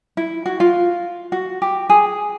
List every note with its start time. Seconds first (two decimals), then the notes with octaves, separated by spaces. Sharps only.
0.17 E4
0.46 F#4
0.60 F4
1.32 F#4
1.62 G4
1.89 G#4